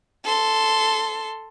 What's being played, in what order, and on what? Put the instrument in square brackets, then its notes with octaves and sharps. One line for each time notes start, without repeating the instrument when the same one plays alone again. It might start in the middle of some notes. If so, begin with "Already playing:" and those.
[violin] A4 C6